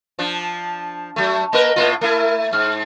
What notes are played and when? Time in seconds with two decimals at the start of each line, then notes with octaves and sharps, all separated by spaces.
0.19 F3 D4
1.16 F#3 A3
1.53 A#3 A#4 B4 D#5
1.76 A2 A#3 F4
2.01 A3 E4 A#4
2.53 G#2 F6